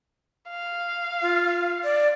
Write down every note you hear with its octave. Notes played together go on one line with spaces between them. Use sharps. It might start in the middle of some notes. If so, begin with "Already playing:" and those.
F5
F4
D5